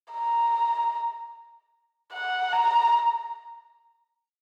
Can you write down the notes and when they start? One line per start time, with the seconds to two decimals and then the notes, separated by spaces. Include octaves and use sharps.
0.14 A#5
2.13 F#5
2.53 A#5